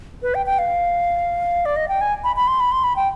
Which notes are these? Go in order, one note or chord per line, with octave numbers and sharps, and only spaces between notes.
B4
G5
G5
F5
D5
D#5
G5
G#5
B5
B5
C6
B5
C6
B5
G5